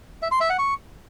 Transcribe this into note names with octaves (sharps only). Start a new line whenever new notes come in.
E5
C6
E5
F#5
C#6